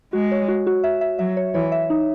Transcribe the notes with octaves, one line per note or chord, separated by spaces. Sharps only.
G#3 F#4
C#5
F#4
F#4
E5
E5
F#3 E5
C#5
E3 C#5
E5
D#4